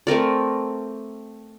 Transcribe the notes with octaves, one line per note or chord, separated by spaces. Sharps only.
A3 C4 A#4 D5